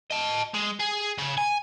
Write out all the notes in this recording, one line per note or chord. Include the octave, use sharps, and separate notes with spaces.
D#5 A5
G#3
G#4
C#3
G#5